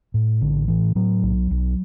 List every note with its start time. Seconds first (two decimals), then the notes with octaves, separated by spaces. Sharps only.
0.14 A2
0.41 A1 D3
0.68 A2 E3
0.95 A2 F#3
1.23 B1
1.51 B1